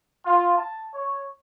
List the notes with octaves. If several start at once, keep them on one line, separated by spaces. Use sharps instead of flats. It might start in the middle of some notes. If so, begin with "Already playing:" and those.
F4
A5
C#5